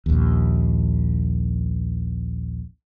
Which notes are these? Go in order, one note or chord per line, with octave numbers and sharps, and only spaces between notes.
A#1 D#2